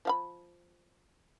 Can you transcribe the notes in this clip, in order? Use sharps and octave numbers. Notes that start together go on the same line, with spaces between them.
F3 F5 B5